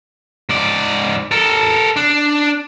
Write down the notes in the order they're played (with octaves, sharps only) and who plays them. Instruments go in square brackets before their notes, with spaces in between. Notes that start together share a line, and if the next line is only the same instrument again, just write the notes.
[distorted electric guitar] G#2 D5
A4 A#4
D4